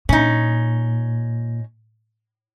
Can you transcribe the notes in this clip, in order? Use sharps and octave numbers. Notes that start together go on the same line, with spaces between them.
A#2 C#4 D#4